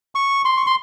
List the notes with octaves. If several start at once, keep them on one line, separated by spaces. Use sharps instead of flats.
C#6
C6
C#6
C6